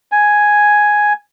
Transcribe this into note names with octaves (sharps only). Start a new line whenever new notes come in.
G#5